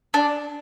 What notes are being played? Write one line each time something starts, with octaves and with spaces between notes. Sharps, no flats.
D4